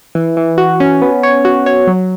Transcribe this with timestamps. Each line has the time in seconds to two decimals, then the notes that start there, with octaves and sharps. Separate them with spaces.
0.15 E3
0.37 E3
0.58 F#4
0.80 C#4
1.02 B3
1.23 C#5
1.45 F#4
1.66 C#5
1.87 F#3